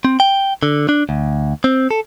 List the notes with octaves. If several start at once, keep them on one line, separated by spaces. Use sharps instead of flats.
C4
G5
D3
D4
D2
C4
A4